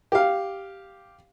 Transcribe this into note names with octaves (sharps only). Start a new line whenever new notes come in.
G4 F5